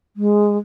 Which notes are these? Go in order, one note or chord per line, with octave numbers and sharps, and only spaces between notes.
G#3